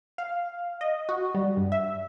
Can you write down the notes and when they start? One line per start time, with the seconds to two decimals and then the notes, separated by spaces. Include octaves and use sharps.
0.18 F5
0.81 D#5
1.09 F#4
1.35 G3
1.57 G2
1.72 E5